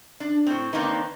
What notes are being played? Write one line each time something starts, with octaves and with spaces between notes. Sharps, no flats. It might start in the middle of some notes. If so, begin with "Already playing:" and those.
D4
A2 C4
D#3 A#3 C4 D4 D#4 B4